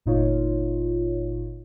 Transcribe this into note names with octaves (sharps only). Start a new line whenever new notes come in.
G1 A#2 D#4 F4 C#5